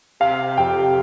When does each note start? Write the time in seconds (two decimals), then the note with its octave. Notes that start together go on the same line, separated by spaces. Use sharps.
0.20 C3 F5
0.57 F2 G4 G5